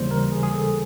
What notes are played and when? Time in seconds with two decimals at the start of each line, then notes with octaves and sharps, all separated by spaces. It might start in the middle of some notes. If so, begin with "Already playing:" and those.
Already playing: D#2 C#3 E3 G3 A#3 C5
0.11 A#4
0.32 G#4
0.43 G#4
0.54 A4